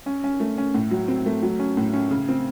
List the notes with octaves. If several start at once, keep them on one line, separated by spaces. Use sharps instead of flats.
C#4
C#4
A3
C#4
A2
F#3
C4
A3
F#3
C#4
A2
C#4
C#3
C4